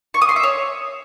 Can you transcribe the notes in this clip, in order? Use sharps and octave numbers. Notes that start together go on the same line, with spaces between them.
C#6
D#6
C6
E5
C#5